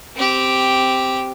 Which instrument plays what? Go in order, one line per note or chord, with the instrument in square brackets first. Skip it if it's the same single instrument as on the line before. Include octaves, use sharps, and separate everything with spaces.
[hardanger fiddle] C4 G4